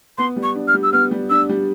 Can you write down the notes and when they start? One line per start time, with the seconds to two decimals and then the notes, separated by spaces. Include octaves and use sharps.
0.18 B3 C6
0.36 G3
0.43 C#6
0.55 D4
0.68 F6
0.74 G3
0.83 E6
0.93 B3 F6
1.11 G3
1.30 D4 E6
1.49 G3